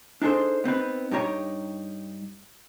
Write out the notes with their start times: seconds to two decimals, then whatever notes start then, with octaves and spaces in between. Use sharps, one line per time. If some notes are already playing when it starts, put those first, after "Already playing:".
0.22 D4 D#4 G#4 A4 C5
0.64 B3 C4 D#4 B4
1.11 G2 D#4 G4 C#5 A#5